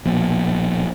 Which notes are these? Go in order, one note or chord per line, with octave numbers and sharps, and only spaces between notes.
A#1 B2